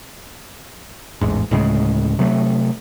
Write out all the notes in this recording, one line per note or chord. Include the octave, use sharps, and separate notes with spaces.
A1 E2 G#2
D2 A2 C#3 G#3
C3 F#3 G#3 A3